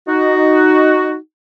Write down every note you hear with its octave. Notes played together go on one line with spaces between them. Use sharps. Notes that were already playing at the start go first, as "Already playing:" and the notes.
D#4 F#4